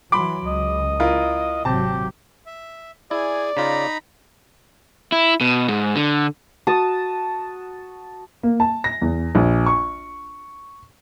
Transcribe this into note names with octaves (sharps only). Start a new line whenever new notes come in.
E3 F#3 B5 C6 D6
C#2 D#5
E4 F4 A#4
G#1 C3 F#3 C4 G4 A5
E5
E4 G#4 D5 G#5
C#3 D#4 F4 A#5 B5
E4
B2
G#2
D3
F#4 A5 D#6
A#3
A5
A#6
E2
A#1
C#6